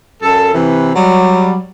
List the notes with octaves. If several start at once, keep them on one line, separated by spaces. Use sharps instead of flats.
F#2 A4
C3 E3
F#3 G3